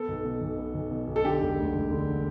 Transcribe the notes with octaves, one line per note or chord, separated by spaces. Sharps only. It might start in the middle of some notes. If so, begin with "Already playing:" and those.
Already playing: B3 A4
B1
B2
B1
B3
B1
B2
B1
A4
D3 G4
E1
D2
E1
D3